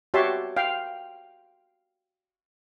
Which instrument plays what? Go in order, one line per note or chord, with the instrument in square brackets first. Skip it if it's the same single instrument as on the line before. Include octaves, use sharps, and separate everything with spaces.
[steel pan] F#4 G4 C#5 E5 A5 C6
F5 G5